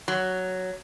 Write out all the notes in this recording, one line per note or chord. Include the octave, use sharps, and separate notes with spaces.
F#3